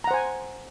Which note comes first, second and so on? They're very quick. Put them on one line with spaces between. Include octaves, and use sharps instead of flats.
A#5 F#5 C5 G#5